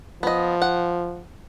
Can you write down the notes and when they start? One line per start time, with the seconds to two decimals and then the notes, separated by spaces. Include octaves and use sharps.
0.23 F3 B3 D#5
0.62 F#5